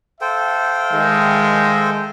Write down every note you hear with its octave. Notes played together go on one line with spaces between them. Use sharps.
A4 C5 E5 F5 G5
D#3 G#3